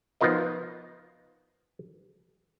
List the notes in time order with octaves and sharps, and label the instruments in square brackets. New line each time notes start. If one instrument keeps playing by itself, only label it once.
[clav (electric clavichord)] F3 B3 D#4 F4 A#4 D#5